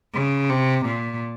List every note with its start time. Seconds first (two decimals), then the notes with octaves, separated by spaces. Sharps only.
0.14 C#3
0.49 C3
0.85 A#2